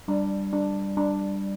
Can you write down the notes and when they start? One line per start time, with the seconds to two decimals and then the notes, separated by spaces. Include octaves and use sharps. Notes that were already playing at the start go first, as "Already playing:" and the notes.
0.08 G3 D4
0.53 D4
0.97 D4